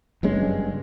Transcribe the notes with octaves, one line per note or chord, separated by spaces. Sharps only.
F#1 G2 G#3 C#4